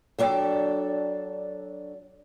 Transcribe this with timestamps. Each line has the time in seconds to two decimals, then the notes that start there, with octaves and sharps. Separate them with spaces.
0.19 F#3 D4 A4 D5 G5